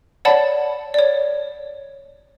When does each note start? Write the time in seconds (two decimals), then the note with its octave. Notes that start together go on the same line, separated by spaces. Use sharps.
0.25 C#5 D5 F#5 A5 B5
0.94 C#5 D5